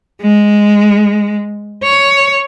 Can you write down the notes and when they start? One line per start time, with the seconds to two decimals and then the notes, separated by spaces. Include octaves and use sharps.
0.22 G#3
1.84 C#5